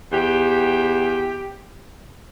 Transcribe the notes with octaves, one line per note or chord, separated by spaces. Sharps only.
E2 G4